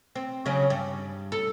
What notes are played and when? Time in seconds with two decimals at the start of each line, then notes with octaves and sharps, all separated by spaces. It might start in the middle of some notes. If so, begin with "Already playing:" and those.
0.15 C4
0.46 C#3 F#3 C#4
0.70 G2
1.32 A4